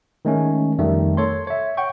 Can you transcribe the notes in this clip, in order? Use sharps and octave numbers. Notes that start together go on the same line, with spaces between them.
D#3 G#3 A3 C#4
F2 D#3 G3 A3
A4 C#5 C6
C#5 E5
F#5 G5 C#6